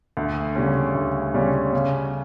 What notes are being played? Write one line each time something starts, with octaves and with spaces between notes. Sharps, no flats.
D2
C#3 G3 C#4
D2
C#3 G3 C#4
C#3